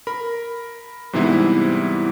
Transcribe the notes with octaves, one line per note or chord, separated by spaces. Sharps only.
A#4 B5
G#2 C3 E3 G3 B3 E4